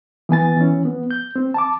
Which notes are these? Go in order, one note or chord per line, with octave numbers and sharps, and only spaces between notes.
E3 B3 G#5 A6
E3 C#4
B3
G6
C4
A5 D6